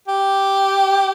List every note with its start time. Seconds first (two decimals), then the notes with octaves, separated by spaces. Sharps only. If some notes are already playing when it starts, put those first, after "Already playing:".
0.08 G4